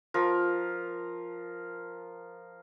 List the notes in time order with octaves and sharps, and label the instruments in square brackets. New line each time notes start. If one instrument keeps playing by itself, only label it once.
[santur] F3 A#4